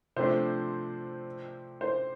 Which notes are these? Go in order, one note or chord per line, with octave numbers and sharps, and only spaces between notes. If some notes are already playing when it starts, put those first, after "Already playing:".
C3 F3 A3 D4 C5
C5